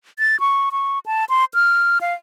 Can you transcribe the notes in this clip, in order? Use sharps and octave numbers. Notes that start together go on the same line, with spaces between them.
A6
C#6
C#6
A5
C6
F6
F5